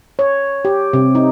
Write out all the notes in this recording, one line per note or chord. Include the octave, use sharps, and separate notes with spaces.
C#5
G4
C3
D#4